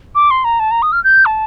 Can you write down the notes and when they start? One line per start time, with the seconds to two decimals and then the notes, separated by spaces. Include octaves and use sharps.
0.15 D6
0.31 C6
0.44 A#5
0.59 A5
0.71 A#5
0.82 D#6
0.92 F6
1.04 G6
1.25 A5